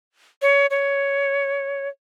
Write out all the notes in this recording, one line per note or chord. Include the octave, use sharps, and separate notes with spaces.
C#5
C#5